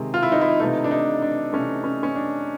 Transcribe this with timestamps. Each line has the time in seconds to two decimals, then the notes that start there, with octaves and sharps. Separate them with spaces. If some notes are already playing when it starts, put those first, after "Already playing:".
Already playing: C3 D#3 G#3
0.14 F4
0.23 E4
0.32 D#4
0.41 E4
0.60 C3 E3 A3 D#4
0.84 D4
0.91 D#4
1.22 D4
1.53 C3 E3 A3 C#4
1.84 C#4
2.03 C#4
2.16 D4